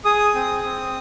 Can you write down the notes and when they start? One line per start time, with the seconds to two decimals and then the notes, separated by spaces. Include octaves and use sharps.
0.05 G#4 D#6
0.35 C4
0.64 C4